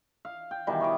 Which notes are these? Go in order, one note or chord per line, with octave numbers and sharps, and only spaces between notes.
F5
G5
B2 D#3 E3 G3
C#5 D#5 D6